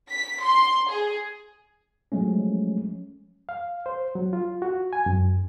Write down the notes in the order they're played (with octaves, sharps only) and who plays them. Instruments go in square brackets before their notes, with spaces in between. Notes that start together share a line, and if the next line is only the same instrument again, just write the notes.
[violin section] B6
C6
G#4
[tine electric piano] F3 F#3 G#3 A3 C#4
[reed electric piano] F5
C5
F#3
F4
F#4
G#5
F#2